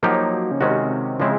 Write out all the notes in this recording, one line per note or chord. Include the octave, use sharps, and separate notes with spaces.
F3 F#3 A#3 D#4 G4
C#3
C3 D#3 G#3 C#4 F#4
C#3 F3 G#3 C4 E4